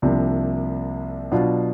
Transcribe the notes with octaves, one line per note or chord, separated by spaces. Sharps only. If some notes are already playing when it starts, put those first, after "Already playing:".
C2 C3 F3 A#3 D4
B2 F#3 B3 D4 F4